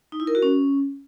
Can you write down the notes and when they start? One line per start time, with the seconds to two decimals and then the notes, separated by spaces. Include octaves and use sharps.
0.12 D#4
0.20 E4
0.27 A#4
0.35 F#4
0.42 C#4